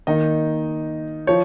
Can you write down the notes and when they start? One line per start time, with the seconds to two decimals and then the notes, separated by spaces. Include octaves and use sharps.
0.07 D#3 A#3 D#4 D#5
1.27 F3 C#5